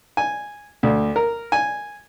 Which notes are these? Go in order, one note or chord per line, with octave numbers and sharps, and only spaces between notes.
G#5
D2
A#4
G#5